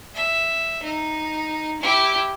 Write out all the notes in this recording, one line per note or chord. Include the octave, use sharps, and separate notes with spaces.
E5
D#4
E4 G4